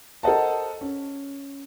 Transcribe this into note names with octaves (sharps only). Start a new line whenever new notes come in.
A4 A#4 C5 D#5 F#5 A5
C#4